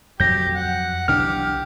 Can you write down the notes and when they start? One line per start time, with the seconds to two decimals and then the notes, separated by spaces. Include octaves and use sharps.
0.20 F2 F#3 G4 G6 A#6
0.54 F#5
1.08 B1 E3 D4 G4 F6